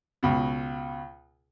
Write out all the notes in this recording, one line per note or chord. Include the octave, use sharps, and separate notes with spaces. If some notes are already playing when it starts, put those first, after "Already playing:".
C#2 B2